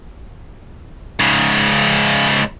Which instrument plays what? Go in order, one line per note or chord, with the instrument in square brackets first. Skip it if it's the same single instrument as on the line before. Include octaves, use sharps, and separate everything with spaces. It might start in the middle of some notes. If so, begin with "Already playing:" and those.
[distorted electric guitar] G#2 C#3